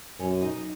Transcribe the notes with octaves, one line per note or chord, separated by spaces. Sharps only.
F#2 C#4
D#4